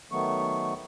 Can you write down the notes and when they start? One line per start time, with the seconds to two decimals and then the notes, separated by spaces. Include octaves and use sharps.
0.12 D#3 F#3 A3 B3 C#6